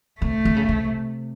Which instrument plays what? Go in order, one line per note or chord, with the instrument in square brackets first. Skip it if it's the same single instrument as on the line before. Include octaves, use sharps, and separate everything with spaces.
[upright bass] C3 [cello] A3
[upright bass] D3
C#3
C3